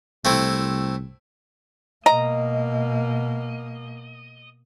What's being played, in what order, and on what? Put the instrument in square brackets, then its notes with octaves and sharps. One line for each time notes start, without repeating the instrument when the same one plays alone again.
[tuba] C2 [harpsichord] A3 C4 E4
[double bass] B2 A#3 [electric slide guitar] D#5 [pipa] A#5